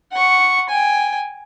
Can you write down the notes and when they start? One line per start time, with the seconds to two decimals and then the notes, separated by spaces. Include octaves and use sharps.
0.12 F#5 C#6
0.69 G5 G#5